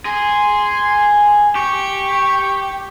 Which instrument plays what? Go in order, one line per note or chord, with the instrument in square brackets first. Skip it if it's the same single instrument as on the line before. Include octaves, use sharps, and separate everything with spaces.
[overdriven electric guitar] G#4 [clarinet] C6
[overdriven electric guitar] G4 [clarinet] C#6